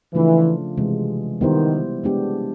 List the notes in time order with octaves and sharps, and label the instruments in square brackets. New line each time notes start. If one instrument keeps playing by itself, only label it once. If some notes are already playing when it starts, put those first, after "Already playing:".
[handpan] C#3 F3 A3 D4 F4 [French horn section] E3
[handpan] C3 E3 G#3
[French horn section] D#3 [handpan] G3 B3 E4 G4 C5
[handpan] G#3 B3 D4 G4